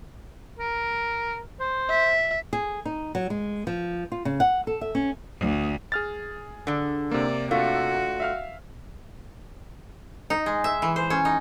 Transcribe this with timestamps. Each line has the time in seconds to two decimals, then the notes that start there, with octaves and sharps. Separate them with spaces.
0.59 A#4
1.60 C5
1.90 E5
2.53 G#4
2.85 D#4
3.15 F#3
3.30 G#3
3.67 F3
4.12 F4
4.25 C#3
4.40 F#5
4.67 A4
4.81 E5
4.95 C#4
5.38 D2
5.92 G#4 F6 A6
6.67 D3 D4
7.11 C3 A#3 D5
7.51 A3 D4 F4 F#4
8.20 E5 F5 F6
10.30 D#4
10.46 G#3
10.64 E5
10.82 E3
10.96 C5
11.10 C#4
11.25 D#4